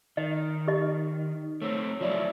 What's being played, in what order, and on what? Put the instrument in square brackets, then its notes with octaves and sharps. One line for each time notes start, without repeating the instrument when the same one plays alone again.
[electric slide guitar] D#3 [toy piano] D#5
[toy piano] G4 D#5
[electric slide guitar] A3 C4 [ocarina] C#5
[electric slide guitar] F3 F#3 E4 [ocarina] D5